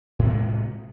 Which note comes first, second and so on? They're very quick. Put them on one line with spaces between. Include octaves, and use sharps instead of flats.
A2 C3 B3 G#3